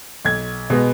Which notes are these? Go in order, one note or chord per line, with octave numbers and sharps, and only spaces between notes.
B1 G#6
B2 G#3 B3